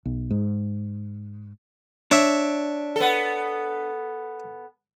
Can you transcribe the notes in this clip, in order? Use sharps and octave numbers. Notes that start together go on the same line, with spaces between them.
B1
G#2
D4 C#5 E5
B3 A4